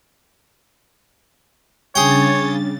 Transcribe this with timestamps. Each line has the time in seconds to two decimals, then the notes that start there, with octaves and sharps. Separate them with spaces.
1.95 C#3 G3 C#4 D4 G#4 C#5 G5 A6